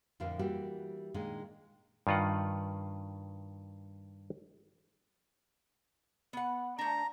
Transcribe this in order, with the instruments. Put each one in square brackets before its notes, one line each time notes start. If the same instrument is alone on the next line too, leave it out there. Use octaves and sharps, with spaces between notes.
[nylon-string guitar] F2 A2 D3 A#4 F5
E3 G3 A#3 F#4 G4
A#2 D#3 G#3 D4
[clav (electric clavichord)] G2 D#3 F4 D#5 F#5
[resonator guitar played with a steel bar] B3 F#5
[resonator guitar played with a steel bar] A3 D4 [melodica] A#5